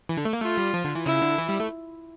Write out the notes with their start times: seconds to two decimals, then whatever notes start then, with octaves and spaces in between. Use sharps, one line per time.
0.09 E3
0.17 D3
0.25 A3
0.33 A#3
0.42 A3 F4
0.57 G3
0.74 F3
0.85 D3
0.95 E3
1.06 C#3 E4
1.22 D3
1.38 E3
1.49 G3
1.60 A3